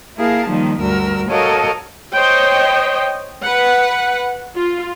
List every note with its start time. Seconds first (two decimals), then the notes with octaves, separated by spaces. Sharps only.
0.16 A#3 E4 G#4 A#4 F5 A5
0.48 D#3 F3 G3 A#3 D#4
0.80 D2 G2 G3 F#4 A#4 E6
1.28 F#4 A4 A#4 C#5 D#5 F5
2.12 C5 C#5 D#5 G5
3.43 B4 F#5
4.55 F4